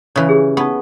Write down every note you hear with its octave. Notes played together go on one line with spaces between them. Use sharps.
C#3 E3
G4 G#4
B3 D#4 C#6